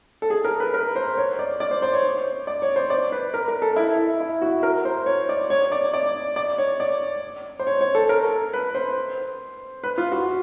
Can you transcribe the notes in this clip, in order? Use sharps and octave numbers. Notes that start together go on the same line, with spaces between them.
A4
G#4
A#4
B4
A#4
C5
C#5
D5
D5
C5
C5
C#5
D5
C#5
C5
D5
B4
A#4
A#4
A4
E4
E4
F#4
A#4
C5
C#5
D5
C#5
D5
D5
D5
C#5
D5
C5
C#5
C#5
A4
A#4
B4
C5
B4
F4
F#4